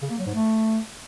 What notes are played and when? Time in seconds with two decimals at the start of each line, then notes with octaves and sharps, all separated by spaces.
0.02 C#3
0.10 A#3
0.18 F#3
0.26 G#2
0.34 A3